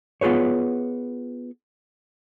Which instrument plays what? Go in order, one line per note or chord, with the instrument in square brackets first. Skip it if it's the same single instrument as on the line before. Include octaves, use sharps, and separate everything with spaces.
[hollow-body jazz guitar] B3 F4 G#4 B4 C#5